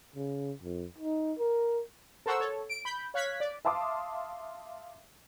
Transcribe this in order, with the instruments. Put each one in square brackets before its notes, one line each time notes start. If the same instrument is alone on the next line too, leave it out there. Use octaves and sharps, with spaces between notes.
[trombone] C#3
F2
D#4
A#4
[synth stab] A4 A#4 C5 F#5 C#6 E6
A4 C#5
D7
B5 G6
C#5 F5 F#6 G#6 B6
D5
[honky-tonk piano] E5 F5 A5 C6 D6 D#6